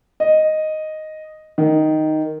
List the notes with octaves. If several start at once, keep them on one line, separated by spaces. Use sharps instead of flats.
D#5
D#3